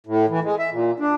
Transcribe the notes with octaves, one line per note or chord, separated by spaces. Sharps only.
A2
E3
G#3
E5
A#2
D4